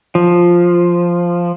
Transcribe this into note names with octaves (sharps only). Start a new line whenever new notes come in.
F3